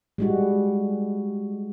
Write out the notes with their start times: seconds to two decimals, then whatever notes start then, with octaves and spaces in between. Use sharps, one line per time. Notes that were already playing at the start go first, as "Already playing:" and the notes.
0.18 G3 G#3 F#4